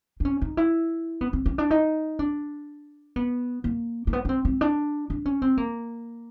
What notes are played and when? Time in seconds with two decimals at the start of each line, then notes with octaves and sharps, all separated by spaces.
0.20 D4
0.25 C#4
0.42 D#4
0.57 E4
1.21 B3
1.33 C4
1.46 C#4
1.58 D4
1.70 D#4
2.19 D4
3.16 B3
3.64 A#3
4.07 A#3
4.13 B3
4.25 C#4
4.29 C4
4.45 C4
4.61 D4
5.10 D4
5.26 C#4
5.42 C4
5.57 A#3